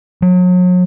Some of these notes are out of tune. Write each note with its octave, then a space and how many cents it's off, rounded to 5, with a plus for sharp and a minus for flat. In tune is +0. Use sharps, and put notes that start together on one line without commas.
F#3 -35